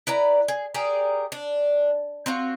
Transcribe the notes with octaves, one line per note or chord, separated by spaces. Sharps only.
E4 B4 D5 A#5
G#4
G4 G#4 A#4 D5
D4
C4 F4 F#4